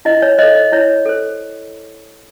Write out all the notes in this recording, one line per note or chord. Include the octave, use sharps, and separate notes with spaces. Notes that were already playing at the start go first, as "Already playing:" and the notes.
E4 D#5
C#5
A4 C5 D#5
D#5
E4 C#5
A4 C5